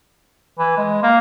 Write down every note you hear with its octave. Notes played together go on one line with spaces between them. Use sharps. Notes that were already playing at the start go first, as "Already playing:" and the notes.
E3
G#3
A#3